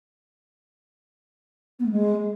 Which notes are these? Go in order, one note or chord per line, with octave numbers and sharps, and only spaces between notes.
B3
A3
G#3